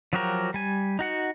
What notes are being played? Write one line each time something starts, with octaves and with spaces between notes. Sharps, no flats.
F3 F#3 F#4 G4 A#4
G3 G#5
D#4 F#4 F#5